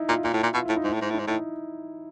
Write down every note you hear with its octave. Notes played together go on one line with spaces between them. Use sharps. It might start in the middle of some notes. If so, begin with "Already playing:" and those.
Already playing: D#4 E4
A#2 F4
A#2 F4
A2
E4
A#2
B2 F4
A2 E4
D#4
G#2
E4
A2
G#2
A2 D#4
G#2
A2 E4